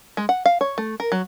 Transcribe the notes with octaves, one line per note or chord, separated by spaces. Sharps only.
G#3
F#5
F5
C#5
A3
A#4
F#3